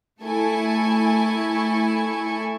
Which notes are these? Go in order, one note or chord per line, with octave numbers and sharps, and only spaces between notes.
A3 E4 A4 G#5 C#6